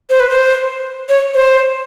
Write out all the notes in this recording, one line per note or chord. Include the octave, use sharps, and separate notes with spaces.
C5
B4
C5
C#5
C5